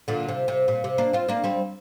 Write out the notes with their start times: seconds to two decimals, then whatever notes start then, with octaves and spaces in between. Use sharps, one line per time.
0.08 A#2 D3
0.29 C3
0.48 C3
0.68 A#2
0.84 C3
0.98 A#3 D4
1.13 C4 F4
1.28 A#3 D4
1.44 G3 C4